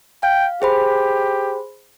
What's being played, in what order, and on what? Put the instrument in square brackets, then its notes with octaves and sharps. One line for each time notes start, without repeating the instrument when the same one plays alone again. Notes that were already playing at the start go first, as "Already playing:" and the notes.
[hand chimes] F5 [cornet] G5
[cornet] G4 [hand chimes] G#4 C5 B5